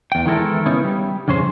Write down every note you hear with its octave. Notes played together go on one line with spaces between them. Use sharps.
E2 G5
D#3 E3 G#3 E4 A4 A#4
C#3 B3 C#4 D#4 E4
G3
F2 C#3 C#4 G#4 C5